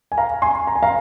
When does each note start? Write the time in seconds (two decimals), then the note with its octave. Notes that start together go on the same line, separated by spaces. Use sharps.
0.12 G#5
0.18 F5 A#5
0.42 G#5 C6
0.67 A#5
0.76 G#5
0.83 F5 A#5